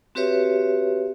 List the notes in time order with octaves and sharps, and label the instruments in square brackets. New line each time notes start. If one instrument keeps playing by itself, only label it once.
[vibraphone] C4 F#4 G4 B4 C#5 E5